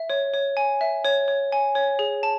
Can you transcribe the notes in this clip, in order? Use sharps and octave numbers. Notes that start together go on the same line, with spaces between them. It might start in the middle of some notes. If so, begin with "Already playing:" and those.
Already playing: E5
C#5
C#5
G#5
E5
C#5
C#5
G#5
C#5
G#4
A5